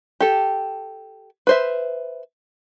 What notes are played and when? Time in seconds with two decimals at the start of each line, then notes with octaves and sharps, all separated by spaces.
0.20 G4 A4
1.47 B4 C5 E5